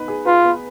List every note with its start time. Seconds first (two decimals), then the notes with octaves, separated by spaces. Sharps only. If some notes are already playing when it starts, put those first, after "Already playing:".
Already playing: B3 D#4 B4
0.08 G#4
0.26 F4 B4
0.44 B3